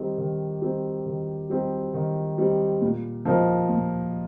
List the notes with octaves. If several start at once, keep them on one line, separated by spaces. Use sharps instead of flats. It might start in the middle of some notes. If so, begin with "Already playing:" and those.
Already playing: D#3 G3 C4 D#4 G4
D#3
G3 C4 D#4 G4
D#3
G3 C4 D#4 G4
D#3
G3 C4 D#4 G4
A#2
F3 A#3 D#4
A#2